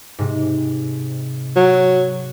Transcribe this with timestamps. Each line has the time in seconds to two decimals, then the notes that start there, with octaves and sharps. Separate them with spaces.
0.19 G#2 C3
1.56 F#3